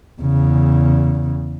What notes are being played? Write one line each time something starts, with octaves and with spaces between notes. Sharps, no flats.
E2 C#3